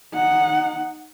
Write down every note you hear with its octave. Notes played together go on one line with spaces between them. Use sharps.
D#4 F#5